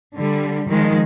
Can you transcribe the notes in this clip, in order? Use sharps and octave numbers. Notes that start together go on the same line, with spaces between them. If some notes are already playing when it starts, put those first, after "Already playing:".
D3 G3
D#3 F3 G#3